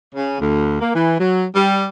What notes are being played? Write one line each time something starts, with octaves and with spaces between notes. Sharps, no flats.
C#3
D2
A#3
E3
F#3
G3